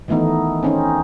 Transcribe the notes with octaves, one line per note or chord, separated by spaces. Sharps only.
D#3 E3 A3 B3 D#4
C4 C#4 D#4